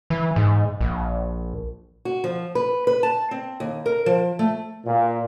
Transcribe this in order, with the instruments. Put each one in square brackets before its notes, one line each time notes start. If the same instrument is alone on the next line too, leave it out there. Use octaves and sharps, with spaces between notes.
[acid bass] E3
G#2
A#1
[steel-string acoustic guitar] F#4
F3
B4
B4
A5
C4
D#2
A#4
F3
A3
[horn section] A#2